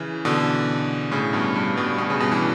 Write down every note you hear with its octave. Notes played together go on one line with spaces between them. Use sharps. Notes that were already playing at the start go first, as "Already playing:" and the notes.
Already playing: C#3 E3
B2 D3
A2 C#3
G2 B2
G2
G2 B2
B2
C#3
G2 B2
E3